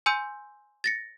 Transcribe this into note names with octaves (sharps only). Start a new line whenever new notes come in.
G#5 C6 E6 G6 D#7
A6 A#6 C#7